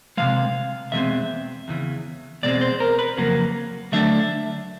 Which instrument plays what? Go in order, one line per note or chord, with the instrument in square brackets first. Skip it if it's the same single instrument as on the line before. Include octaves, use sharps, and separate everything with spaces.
[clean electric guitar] C3 F3 G#3 F5
E2 B2 G#3 C4 E5
E2 C#3 E3
E2 B2 G#3 C4 D5
C5
A#4
B4
F2 C#3 F#3 A#3
D3 F#3 A3 D4 E5